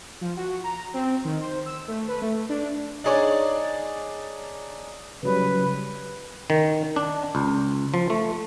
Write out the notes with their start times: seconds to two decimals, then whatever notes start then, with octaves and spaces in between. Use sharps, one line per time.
0.21 F3
0.37 F#4
0.64 A#5
0.94 C4
1.25 D#3
1.40 C5
1.66 E6
1.88 A3
2.08 B4
2.22 A3
2.49 D4
3.04 D4 D#4 G#4 C#5 D5
5.23 C#3 F#3 G3 B4
6.50 D#3
6.96 D4
7.35 C#2
7.94 F3
8.10 A3